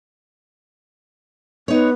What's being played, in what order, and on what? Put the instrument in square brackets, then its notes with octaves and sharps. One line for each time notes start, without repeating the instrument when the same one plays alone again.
[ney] B3 [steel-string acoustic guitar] D#4 C#5